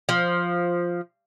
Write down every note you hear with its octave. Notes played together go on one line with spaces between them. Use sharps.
F3